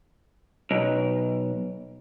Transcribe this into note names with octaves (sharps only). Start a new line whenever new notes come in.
B1